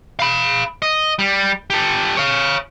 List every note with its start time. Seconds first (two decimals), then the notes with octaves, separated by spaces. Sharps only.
0.19 F5 B5
0.82 D#5
1.19 G3
1.70 G4 A4
2.17 C#5 F5